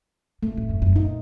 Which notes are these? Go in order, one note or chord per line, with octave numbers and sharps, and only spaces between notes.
A#2 A3
A2
F#2
F#2
A#2 D#4